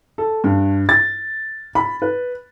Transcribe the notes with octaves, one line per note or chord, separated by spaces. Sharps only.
A4
G2
A6
B5
B4